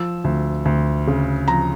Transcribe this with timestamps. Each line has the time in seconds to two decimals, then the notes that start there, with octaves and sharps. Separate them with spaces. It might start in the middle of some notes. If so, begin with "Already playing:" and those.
Already playing: F3 E6
0.24 D2
0.65 D2
1.07 C#3
1.48 F3 A#5